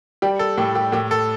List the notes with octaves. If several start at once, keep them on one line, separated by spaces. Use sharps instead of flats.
G3 G4
A4
A2 G4
G4
A2 G4
A4